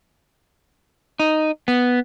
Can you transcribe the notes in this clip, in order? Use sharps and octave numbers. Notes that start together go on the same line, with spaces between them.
D#4
B3